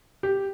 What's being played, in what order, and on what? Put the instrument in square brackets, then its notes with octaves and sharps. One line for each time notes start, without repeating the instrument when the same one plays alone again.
[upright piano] G4